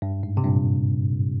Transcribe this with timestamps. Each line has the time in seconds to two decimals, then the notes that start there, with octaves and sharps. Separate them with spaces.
0.02 G2
0.23 G#2
0.37 C3
0.44 G2 A#2